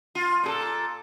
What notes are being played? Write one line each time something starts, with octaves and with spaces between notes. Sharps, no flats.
F4
A#2 G#4 A4